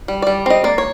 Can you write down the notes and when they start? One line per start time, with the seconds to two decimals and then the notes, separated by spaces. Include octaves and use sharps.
0.08 G3
0.22 G3 D5
0.46 C4 D#5
0.64 A#3 D5
0.78 C#5